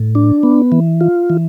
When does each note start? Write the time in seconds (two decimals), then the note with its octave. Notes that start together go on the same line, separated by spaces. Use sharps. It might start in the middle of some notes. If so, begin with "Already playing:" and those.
Already playing: A2
0.15 D4
0.43 B3
0.72 E3
1.01 F4
1.30 E3